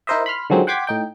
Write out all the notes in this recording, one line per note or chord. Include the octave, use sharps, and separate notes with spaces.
D#4 E4 A#4 C5 D#5 E5
B5 C6 F6
D3 D#3 F3 F#3 G#3 C4
F#5 G5 C6 D6 G#6 B6
A2 D#4 G5